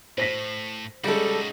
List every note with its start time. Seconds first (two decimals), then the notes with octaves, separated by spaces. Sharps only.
0.18 A2 C5 A#6 B6
1.04 C#3 G3 G#3 D#4 F#4 A4